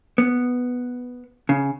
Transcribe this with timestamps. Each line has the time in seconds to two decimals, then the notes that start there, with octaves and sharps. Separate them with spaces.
0.18 B3
1.49 C#3